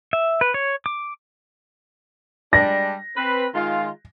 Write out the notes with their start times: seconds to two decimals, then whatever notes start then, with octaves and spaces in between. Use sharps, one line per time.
0.13 E5
0.41 B4
0.54 C#5
0.86 D6
2.53 G3 G#3 D4 A#6
3.16 C4 B4
3.54 D#3 G#3 F4